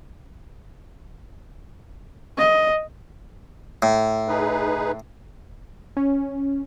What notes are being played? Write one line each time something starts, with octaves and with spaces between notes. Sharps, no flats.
D#5
A2
D#4 G#4 B4
C#4